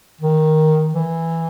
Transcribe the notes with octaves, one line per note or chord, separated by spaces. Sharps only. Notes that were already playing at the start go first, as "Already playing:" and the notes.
D#3
E3